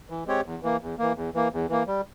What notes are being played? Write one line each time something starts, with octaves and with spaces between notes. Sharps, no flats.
E3
G#3 C4 G4 C#5
E2
E3 A#3
E2
E3 A#3
E2
E3 A#3
E2
E3 A#3
G3